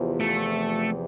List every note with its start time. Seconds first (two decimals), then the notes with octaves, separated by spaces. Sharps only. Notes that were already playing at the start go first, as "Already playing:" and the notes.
Already playing: E2 C3 F3
0.20 A3